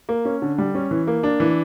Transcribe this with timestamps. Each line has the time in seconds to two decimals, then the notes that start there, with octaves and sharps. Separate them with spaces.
0.09 A#3
0.25 C#4
0.42 D3
0.58 G3
0.75 C#4
0.91 E3
1.07 A#3
1.23 D4
1.40 E3